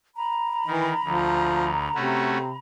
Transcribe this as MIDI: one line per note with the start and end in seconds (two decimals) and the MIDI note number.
0.15 2.58 82
0.15 2.58 83
0.67 0.93 51
0.67 0.92 52
1.05 1.88 38
1.05 1.70 53
1.95 2.54 48
1.95 2.38 57
1.95 2.38 61
1.95 2.38 66